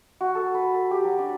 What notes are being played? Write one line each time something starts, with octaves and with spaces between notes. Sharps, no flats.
F#4
A4
B4
A4
G4
F#3
D4